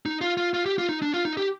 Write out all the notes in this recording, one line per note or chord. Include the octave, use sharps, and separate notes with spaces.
D#4
F4
F4
F4
G4
F4
D#4
D4
F4
D#4
G4